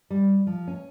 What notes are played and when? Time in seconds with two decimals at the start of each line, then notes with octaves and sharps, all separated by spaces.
0.10 G3
0.47 F3
0.68 C#4